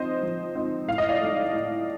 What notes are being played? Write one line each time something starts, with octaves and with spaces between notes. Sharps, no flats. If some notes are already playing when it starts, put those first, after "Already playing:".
Already playing: F3 C4 D#4 C5 D#5
F3
C4 D#4
A2 F5
D#5
D5 F5
A3 D#4
A2